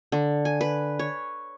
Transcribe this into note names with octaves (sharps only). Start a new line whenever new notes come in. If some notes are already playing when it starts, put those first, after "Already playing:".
D3
G#5
B4
C#5